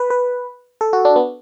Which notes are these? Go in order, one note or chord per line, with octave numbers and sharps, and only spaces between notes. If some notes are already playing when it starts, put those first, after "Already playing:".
Already playing: B4
B4
A4
F#4
D4
B3